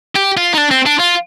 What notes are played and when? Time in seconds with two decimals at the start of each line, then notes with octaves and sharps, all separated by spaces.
0.16 G4
0.37 F4
0.54 D#4
0.58 D4
0.71 C4
0.86 D4
1.00 F4